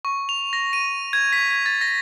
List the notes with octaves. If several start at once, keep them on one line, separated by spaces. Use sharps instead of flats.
C#6
F7
A#6
D#7
G#6
B6
G#6
A6
A#6